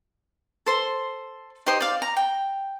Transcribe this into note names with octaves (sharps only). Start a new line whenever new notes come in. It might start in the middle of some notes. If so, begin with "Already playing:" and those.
A4 C5 C6
D#4 G4 C5 D#6
D5 F5
A#5
G5